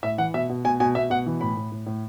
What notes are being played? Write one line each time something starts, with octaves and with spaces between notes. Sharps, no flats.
A2 E5
E3 F#5
B2 E5
B2
B2 G#5
B2 G#5
B2 E5
B2 F#5
E3
A2 B5
A2
A2
A2